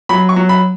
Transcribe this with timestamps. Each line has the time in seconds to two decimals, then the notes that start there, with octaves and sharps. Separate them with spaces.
0.09 F#3 B5
0.29 C#6
0.36 F#3
0.49 B5